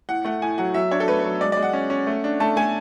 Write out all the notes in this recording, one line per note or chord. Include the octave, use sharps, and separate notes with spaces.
A2 F#5
A3 F#5
A2 G#5
F#3 F#5
F#3 E5
D4 C#5
A4
A3 B4
B4
F#3
G#3 D5
D5
G#3
F#5
C#4
C#4
A3
D4
A3 A5
A3 G#5